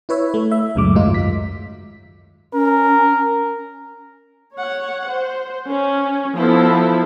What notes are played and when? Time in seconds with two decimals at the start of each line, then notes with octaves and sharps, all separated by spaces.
0.09 E4 B4 C#5 E5
0.34 A3
0.51 E5
0.75 C#2 F#2 A2 F#3 G#3 D6
0.95 G#2 D#3 F#3 D#4 F4
1.14 F#2 B6
2.53 C#4 A#4
4.57 C#5 F#5
5.09 C5
5.70 C#4
6.37 F3 B3 E4 A4